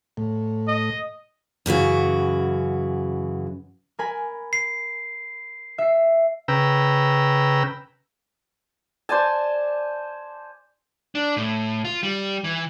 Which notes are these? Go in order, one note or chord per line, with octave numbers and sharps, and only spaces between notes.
A2
D#5
F#2 C#3 E3 F#4
A#4 G#5 B5
C7
E5 C7
C#3 B4 G5 A#5 E6
C5 D5 G#5 A5
D4
A2
F4
G3
E3